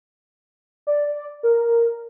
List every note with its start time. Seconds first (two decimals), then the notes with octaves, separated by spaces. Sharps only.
0.87 D5
1.43 A#4